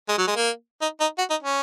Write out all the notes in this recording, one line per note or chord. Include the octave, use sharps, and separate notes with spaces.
G#3
F#3
G#3
A#3
D#4
D#4
F#4
D#4
C#4